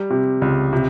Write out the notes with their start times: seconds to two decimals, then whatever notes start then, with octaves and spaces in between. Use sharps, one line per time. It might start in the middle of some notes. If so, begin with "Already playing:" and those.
Already playing: G3
0.10 C3
0.42 C#2
0.73 C3